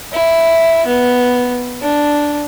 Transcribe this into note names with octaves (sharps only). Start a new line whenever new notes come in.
E4
B3
D4